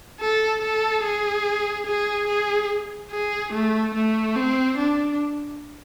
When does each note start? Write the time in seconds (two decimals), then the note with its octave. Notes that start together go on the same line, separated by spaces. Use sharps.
0.20 A4
0.62 A4
1.04 G#4
1.87 G#4
2.28 G#4
3.11 G#4
3.53 A3
3.95 A3
4.36 C4
4.78 D4